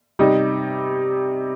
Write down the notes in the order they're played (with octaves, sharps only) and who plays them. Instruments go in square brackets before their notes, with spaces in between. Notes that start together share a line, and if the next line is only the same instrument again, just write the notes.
[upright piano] C3 G3 D#4